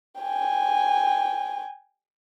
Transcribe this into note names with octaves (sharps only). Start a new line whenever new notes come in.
G5 G#5